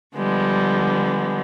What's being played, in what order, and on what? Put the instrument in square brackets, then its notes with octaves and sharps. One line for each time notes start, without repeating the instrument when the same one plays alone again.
[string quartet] D3 F3 G3 G#3 B3